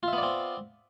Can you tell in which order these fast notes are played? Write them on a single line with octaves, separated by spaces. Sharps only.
F4 E5 B3 D5 C4